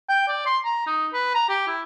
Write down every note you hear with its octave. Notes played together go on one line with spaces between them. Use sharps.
G5
D5
C6
A#5
D#4
B4
A#5
G4
E4